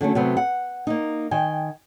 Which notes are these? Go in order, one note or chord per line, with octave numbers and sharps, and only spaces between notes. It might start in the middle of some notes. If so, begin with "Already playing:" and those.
D3 F#3 A3 C#4
C3 F#3 A3 B3
F#5
A#3 D#4
D#3 G5 G#5